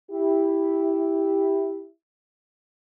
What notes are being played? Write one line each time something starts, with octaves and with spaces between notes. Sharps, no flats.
E4 G4